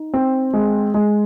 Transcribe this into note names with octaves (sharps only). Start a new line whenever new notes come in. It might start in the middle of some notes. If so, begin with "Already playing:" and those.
Already playing: D#4
C4
G#3
G#3